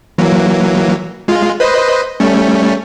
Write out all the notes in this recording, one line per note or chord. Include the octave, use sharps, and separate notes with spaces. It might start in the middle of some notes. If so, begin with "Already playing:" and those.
E3 F#3 A#3
G#3 F4
B4 C5 D#5
G3 A3 C#4